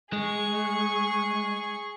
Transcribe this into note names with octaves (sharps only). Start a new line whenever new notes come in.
G#3 G#4 C#6